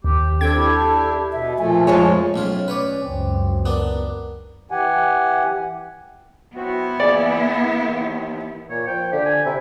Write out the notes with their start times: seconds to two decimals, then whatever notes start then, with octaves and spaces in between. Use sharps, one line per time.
0.04 D#2 G4
0.41 C4 D4 A4 G5 G#6
0.56 D4 E4 G4
1.32 B2 E5
1.58 A#2 F3 A3 G#5
1.87 F2 G#3 C#5
2.34 B1 A2 C#4 F4
2.68 B4 C#5 D5
3.04 C#2 F#2 C4
3.66 B3 D4 A#4
4.71 E3 G4 F#5 G#5
6.56 F#3 B3 C4 E4 F#4
7.00 E3 A#3 G#4 D5
7.74 D#2 C4
8.70 A#2 C#5
8.87 F3 G5
9.12 D3 G4
9.25 G#5
9.46 C3 E4